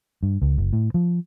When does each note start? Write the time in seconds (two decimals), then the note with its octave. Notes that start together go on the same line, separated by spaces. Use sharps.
0.23 G2
0.42 C#2
0.58 F#1
0.73 A2
0.94 F3